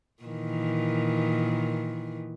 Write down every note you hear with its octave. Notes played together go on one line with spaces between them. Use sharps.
A#2 D#3 E3